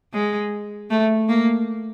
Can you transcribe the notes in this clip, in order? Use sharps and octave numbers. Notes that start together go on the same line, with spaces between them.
G#3
A3
A#3